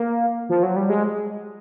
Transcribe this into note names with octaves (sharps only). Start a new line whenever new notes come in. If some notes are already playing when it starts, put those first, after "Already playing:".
Already playing: A#3
F3
F#3
G3
G#3